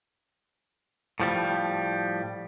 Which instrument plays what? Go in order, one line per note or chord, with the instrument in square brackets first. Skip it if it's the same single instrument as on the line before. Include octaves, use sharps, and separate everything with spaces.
[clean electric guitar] A2 F3 G3